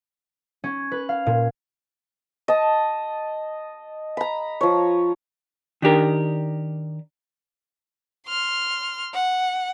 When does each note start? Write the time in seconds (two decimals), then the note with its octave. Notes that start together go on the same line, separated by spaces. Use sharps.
0.64 C#4
0.92 B4
1.09 F5
1.26 A#2
2.48 D#5 A5
4.17 A#5 B5
4.61 F3 C#5
5.82 D#3 D4 G4 A#4
8.27 C6 F6
9.14 F#5